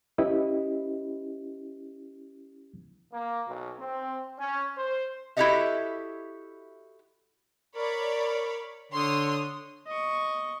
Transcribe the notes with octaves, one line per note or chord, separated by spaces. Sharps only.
C#4 E4 G4 B4 D#5
A#3
B1
C4
C#4
C5
E4 F#4 G4 A4 D#5 E5
A#4 C#5 D5 B5
D3 C#5 C6 D#6
D#5 C#6